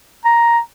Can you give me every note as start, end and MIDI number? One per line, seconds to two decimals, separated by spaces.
0.25 0.59 82